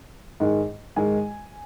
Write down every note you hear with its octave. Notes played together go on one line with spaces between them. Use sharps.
G#2 D#3 G#3
G#2 D#3 G#3 G#5